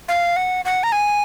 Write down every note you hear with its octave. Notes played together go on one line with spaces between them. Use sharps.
F5
F#5
F#5
A#5
G#5